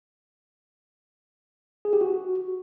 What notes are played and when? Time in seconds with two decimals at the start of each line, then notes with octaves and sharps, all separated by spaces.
1.85 G#4
1.93 G4
2.01 F#4